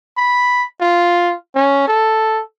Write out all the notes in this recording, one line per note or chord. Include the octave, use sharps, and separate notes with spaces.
B5
F4
C#4
A4